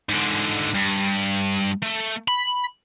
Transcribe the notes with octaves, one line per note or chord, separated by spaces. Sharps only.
G#2 D3
G2
A3
B5